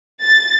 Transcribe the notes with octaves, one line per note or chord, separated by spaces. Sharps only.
A6